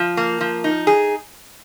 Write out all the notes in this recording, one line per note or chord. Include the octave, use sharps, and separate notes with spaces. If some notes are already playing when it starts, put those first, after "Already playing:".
Already playing: F3
A#3
F3
D#4
G#4